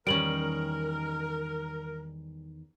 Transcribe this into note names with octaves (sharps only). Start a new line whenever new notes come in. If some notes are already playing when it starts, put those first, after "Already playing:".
E2 D#3 G3 C#4 A#4 D7 F#7